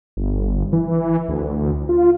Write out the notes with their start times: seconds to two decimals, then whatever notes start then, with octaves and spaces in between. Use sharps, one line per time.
0.17 G1
0.73 E3
1.29 D2
1.89 F4